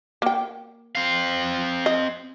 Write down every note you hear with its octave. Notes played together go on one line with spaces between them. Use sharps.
A#3 G5
C4 F5
D#5